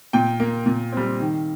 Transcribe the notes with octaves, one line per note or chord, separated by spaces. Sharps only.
A#2 G5
A#3
A#2
G3 C4
D#3